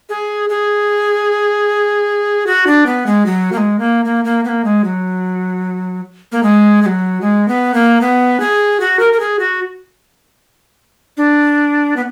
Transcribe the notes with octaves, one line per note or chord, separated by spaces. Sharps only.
G#4
G#4
F#4
D4
B3
G#3
F#3
A#3
G#3
A#3
A#3
A#3
B3
A#3
G#3
F#3
A#3
G#3
G#3
F#3
G#3
B3
A#3
B3
G#4
F#4
A#4
A#4
G#4
F#4
D4
B3